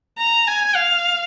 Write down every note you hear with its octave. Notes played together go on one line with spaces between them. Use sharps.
A#5
G#5
F5